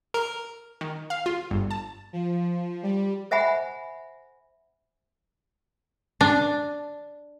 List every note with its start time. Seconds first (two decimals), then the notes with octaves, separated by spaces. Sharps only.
0.14 A#4
0.81 D#3
1.10 F5
1.26 F4
1.51 G1
1.71 A5
2.13 F3
2.83 G3
3.31 C5 E5 F#5 G#5 B5
6.21 D4